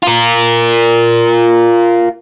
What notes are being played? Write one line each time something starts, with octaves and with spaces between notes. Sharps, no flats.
F4 A#4